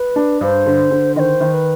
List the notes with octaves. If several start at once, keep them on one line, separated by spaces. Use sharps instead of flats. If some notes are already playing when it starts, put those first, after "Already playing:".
Already playing: B4
D4
G2 C5
D3
D3
D#3 C5 D#5
D#3
B4